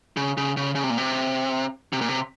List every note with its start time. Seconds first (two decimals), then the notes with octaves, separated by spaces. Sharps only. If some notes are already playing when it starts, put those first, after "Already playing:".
0.17 C#3
0.37 C#3
0.57 C#3
0.75 C#3
0.84 C3
0.90 A#2
0.98 C3
1.93 C3
2.01 A#2
2.08 C3